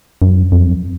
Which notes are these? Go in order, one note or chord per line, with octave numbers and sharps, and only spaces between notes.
F#2
F2